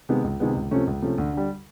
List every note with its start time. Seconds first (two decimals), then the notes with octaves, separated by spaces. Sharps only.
0.09 C3 D#3 G#3 B3
0.24 C#2
0.40 C3 D#3 G#3 B3
0.56 C#2
0.71 C3 F3 A3 C#4
0.87 C#2
1.02 C3 F3 A3 C#4
1.18 D2
1.33 D3 G3